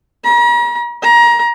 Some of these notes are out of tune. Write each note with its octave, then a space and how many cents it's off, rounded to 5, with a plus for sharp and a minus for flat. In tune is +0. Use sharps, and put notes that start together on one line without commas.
A#5 +45
A#5 +25